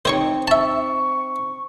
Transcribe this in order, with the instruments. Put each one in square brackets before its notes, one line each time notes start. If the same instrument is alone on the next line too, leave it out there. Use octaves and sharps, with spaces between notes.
[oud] C4 D#4 [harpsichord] C5 C#5 C#6
[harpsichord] E5 A5 [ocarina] C#6